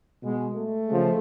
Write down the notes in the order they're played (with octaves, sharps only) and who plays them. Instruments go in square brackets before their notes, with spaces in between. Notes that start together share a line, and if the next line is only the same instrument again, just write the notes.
[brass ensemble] B2 G#3
A3
C#3 F3 G#3